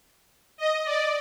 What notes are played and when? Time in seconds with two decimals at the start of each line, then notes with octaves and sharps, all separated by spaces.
0.58 D#5
0.86 D5